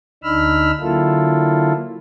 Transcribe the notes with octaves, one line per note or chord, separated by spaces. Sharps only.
D2 D4 D#4 B5 E6 F6
D3 F#3 A#3 E4 F4 A4